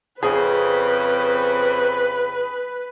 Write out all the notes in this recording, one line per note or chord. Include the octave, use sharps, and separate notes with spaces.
F2 C#3 C4 G#4 B4